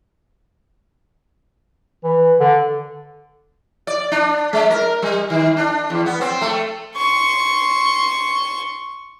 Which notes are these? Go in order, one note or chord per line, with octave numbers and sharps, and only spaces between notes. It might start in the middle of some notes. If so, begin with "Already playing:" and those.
E3
D3
D5
D4
G#3
A#4
G3
D#3
D4
E2
B3
C4
A3
C6 C#6